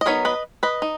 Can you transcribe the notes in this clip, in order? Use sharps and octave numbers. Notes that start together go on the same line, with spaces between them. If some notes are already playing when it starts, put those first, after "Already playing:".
D#5
F#3 B3 D#4 A#4 C#5
B4 D#5
B4 D#5
D#4